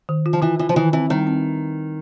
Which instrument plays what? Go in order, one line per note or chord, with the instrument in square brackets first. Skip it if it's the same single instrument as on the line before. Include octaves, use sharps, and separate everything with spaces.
[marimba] D#3
F4
[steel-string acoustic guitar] F3
[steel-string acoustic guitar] E3 [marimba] F4
[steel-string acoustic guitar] E3 [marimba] F4
[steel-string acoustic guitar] F3
[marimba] D#3 [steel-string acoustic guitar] E3
[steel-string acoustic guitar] E3 [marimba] C4
[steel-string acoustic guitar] D#3 [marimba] G3
[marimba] C4